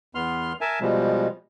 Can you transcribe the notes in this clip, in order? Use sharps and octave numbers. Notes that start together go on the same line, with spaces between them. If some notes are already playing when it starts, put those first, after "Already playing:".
E2 B3 C6 F6
A#4 E5 G#5 A5
B2 F3 G3 G#3